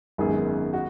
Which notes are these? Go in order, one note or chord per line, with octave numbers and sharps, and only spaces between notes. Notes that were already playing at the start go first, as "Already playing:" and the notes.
G#1 F#2 D#3 B3 G#4
F#4